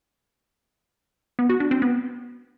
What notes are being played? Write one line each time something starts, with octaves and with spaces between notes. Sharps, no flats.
B3
F#4
D4
C4
B3